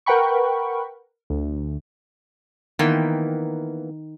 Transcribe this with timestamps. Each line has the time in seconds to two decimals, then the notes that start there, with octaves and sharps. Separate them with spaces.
0.06 A#4 B4 F#5 G5 B5 C#6
1.30 D2
2.79 D#3 E3 A#3 B3 G5 C6